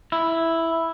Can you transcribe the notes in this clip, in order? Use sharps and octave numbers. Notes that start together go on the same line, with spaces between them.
E4